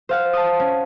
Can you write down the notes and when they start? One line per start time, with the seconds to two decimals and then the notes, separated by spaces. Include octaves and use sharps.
0.09 C5 F5 F#5
0.33 A5 D#6
0.60 C#4